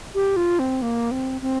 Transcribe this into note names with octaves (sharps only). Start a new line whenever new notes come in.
G4
F4
C4
A#3
C4
C4